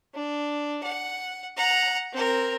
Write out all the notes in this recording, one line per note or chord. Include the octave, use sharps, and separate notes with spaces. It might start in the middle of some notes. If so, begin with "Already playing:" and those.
D4
F#5
F#5 A#5
C4 A#4